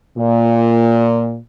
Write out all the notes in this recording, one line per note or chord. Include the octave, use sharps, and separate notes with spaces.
A#2